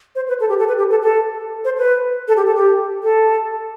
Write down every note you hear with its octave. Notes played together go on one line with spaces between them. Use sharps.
C5
B4
A4
G4
A4
B4
G4
A4
A4
C5
B4
A4
G4
A4
G4
A4